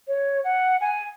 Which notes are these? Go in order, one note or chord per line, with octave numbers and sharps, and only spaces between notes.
C#5
F#5
G#5